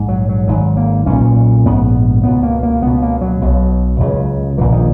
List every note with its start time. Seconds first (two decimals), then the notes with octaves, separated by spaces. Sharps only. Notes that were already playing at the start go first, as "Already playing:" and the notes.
Already playing: A#1 G#2
0.08 F#3
0.29 F#3
0.47 G#1 G#2 F#3
0.77 A#3
1.06 B1 A#2 C#4
1.65 A#1 G#2 B3
2.23 C#2 B2 B3
2.43 A#3
2.63 A#3
2.82 C#2 B2 B3
3.02 A#3
3.21 F#3
3.41 B1 B2
4.00 C#2 C#3
4.58 A#1 A#2 E3
4.72 D#3